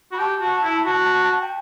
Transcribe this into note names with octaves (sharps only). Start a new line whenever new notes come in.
F#4 B5
G4 A5
F#4
E4
F#4
G5